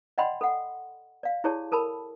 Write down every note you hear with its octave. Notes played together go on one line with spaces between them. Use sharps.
D5 D#5 F#5 G5 B5 C6
A4 F#5
D5 F5
E4 G4 G#4 C#5 D5 A5
A4 A#4 A5 B5